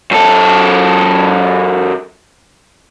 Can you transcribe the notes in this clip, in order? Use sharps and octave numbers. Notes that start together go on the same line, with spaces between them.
F#2 A4